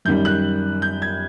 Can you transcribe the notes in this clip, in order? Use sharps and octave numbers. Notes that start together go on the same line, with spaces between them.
F#2 D#3 G3 G6
F#6
G6
G#6